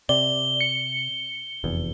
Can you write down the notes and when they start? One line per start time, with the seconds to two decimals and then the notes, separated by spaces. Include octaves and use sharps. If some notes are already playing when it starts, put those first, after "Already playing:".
0.09 C3 D5 G7
0.61 C#7
1.64 F1 E2